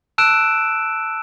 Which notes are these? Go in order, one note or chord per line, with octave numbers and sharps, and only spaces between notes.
A5 E6 F#6 D7 E7